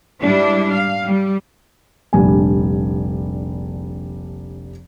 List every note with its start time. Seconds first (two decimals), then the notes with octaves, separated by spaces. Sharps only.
0.21 G#2 G3 D4 E4
0.72 F5
1.06 G3
2.13 F1 A#1 G3 D4 G#5